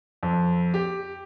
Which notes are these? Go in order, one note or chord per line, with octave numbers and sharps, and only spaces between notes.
F2
G4